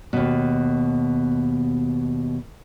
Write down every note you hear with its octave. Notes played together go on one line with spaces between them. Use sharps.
D#2 B2